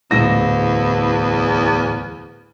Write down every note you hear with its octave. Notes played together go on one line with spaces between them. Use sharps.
D1 E2 A#6